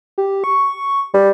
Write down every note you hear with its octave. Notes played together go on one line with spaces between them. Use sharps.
G4
C#6
G3